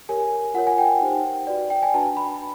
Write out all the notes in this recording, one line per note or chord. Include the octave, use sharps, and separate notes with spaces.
G4 A#4 C#5 G#5
F4 A#4 C#5 F#5
G#5
G5
D#4 G4 C5
F#4 B4 D5
G5
G#5
D4 F#4 B4 A5
B5